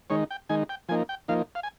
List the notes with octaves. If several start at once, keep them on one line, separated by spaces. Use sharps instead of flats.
D#3 G#3 D#4 C#5
G5
D#3 G#3 D#4 G#5
G5
F3 A#3 D#4 G#5
G5
F3 A#3 D#4 F5
F5
G#5